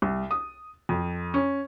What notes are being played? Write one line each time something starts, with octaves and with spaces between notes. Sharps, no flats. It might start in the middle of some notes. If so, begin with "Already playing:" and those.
C2
D#6
F2
C#4